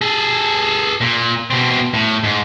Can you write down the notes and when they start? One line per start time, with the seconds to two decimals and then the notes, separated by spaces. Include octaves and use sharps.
0.01 G#4 A4
1.01 A#2
1.50 B2 C4
1.94 A2
2.24 G#2